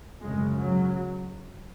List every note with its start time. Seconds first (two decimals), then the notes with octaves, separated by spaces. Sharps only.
0.22 F#2 C#3 G#3
0.57 F#3